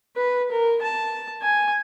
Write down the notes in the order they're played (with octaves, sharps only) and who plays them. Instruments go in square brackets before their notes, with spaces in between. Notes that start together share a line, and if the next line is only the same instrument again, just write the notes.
[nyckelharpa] B4
A#4
A5
G#5